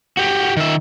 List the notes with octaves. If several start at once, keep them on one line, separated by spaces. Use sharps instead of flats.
F#4 G4
D#3 E5